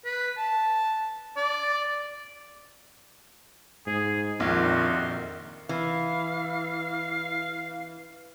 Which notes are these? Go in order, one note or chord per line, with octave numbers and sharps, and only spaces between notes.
B4
A5
D5
G#2 G#4
A#1 F2 A#2 D#3 F#4 C6
E3 F5